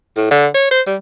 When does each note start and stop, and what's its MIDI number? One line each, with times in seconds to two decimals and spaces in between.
0.17 0.27 45
0.31 0.47 50
0.54 0.68 73
0.71 0.81 72
0.87 0.96 55